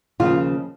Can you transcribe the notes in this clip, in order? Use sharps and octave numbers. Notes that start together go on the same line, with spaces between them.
D#2 C#3 F3 F4